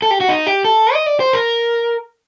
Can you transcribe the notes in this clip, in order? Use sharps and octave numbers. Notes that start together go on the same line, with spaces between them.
A4
G4
F#4
D#4
G4
A4
D#5
D5
C5
A#4